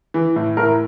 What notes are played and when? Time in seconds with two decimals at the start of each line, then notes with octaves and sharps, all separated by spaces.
0.14 E3
0.36 A2
0.57 A2 A#4